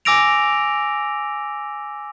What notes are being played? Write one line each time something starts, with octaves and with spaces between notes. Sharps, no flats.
G#5 D6 E6 A#6 D7 F7